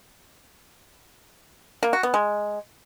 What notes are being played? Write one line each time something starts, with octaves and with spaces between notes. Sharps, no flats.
A#3
F#4
B3
G#3